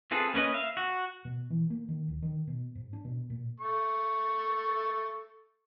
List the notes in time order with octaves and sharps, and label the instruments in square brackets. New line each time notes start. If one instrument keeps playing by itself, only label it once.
[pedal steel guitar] C4 F4 G#4 A4 B4
A#3 C#4 B4 D#5
E5 F5
F#4
[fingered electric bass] B2
E3
A#3
D#3
D1
D#3
B2
G#2
D4
B2
A#2
[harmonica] A4 C#6